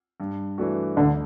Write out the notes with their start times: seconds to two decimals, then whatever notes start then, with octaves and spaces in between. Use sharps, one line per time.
0.20 G2
0.58 E3 A3 D4 F#4
0.97 D2 D3